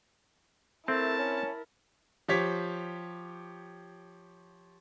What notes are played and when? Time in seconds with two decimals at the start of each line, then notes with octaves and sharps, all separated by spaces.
0.88 A3 C4 E4 A#4 A5
1.19 C#4
2.28 F3 G4 C#5 B6